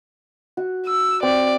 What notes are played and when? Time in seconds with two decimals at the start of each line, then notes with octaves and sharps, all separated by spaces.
0.57 F#4
0.87 E6
1.23 C4 D5